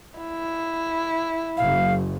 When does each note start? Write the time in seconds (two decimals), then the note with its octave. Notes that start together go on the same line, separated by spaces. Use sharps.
0.18 E4
1.57 F#1 F5